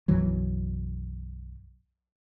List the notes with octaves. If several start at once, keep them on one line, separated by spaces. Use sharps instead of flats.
B1 F#2 E3 F#3